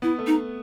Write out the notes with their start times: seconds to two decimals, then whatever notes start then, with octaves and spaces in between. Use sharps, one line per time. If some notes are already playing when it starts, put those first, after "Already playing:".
0.02 B3 E4
0.19 A3
0.27 D#4